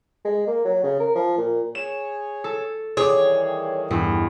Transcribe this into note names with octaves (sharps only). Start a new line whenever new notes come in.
G#3
A#3
F#3
C#3
A#4
F3
A#2
G#4 C#5 E7
A4
D#3 E3 G3 G#4 C#5 D6
E2 G2